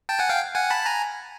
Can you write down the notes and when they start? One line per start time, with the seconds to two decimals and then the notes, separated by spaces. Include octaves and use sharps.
0.09 G5 A5
0.19 F#5 G#5
0.29 F5 G5
0.55 F#5 G#5
0.70 A5 B5
0.86 G#5 A#5